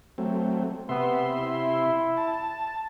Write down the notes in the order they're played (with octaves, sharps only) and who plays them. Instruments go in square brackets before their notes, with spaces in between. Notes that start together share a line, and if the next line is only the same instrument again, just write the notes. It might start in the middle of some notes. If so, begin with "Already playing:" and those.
[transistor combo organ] F#3 A3 C4
[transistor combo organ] C3 E5 C6 [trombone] B3
[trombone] E4
[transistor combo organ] A5